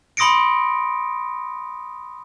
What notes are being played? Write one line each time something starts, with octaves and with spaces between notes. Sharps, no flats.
B5 C6 D#6 A#6 C#7 D7